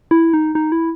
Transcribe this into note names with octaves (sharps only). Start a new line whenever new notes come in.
E4
D#4
D#4
E4